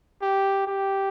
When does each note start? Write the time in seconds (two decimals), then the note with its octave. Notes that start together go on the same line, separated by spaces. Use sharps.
0.22 G4
0.67 G4